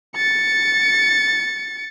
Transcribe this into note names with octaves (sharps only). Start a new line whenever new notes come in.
A6 C#7